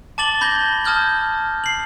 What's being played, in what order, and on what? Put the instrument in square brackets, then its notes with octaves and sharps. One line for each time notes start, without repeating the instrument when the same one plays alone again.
[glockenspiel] A5 D6 A6 F#7 G7
B5 G6 G#6 A#6 G7
A5 D#6 F6 G6 G#6
C7 F#7